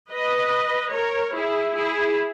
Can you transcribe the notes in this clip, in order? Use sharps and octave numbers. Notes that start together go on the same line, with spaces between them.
B4 D#5
A#4 C#5
E4 G#4
E4 G#4